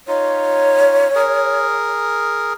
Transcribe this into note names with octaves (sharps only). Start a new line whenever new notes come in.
D#4 F4 C#5
G#4 A#4